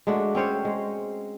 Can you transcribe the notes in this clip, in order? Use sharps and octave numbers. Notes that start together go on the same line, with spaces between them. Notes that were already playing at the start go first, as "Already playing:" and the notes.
G#3 A3 D4 F#4
C4 C#4 C5 C#5
G#3